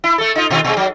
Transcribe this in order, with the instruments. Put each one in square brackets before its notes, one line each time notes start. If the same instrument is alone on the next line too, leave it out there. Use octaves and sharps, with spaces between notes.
[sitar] E4
A3 A4
D#4 F4
B2 D#3 F4
B2 G#3
F#3